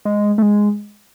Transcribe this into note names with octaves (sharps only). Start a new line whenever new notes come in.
G#3
A3
G#3